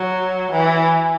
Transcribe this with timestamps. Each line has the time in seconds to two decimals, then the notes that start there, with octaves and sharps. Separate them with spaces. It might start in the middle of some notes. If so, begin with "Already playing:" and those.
Already playing: F#3
0.51 E3